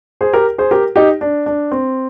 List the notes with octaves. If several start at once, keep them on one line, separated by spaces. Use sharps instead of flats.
G#4 C5
G4 A#4
G#4 C5
G4 A#4
D#4 G4
D4
D4
C4